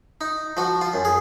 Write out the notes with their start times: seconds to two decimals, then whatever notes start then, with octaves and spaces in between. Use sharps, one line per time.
0.21 D#4
0.57 F3 F#4
0.81 F4
0.94 F#2
1.05 G#4